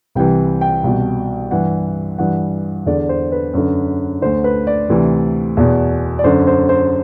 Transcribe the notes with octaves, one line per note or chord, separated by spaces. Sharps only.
C2 C3 E3 G5
G5
C2 B2
G2 E3 F#5
G2 E3 F#5
E2 D3 D5
C5
B4
F#2 D3
D2 D3 C5
B4
D5
D2 C3 E3
E2 B2
D5
F#2 D3 C5
C5
C5